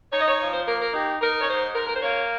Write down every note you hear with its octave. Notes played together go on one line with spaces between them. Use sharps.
D#4 C#5
D#5
C#5
F3 C#5
C5
A#3 A#4
A#4
D#4 G4
D#4 A#4
C#5
G#2 C5
G#2 A#4
A#4
C5
A#3 C#5